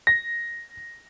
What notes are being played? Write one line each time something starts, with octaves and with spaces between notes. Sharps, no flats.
A#6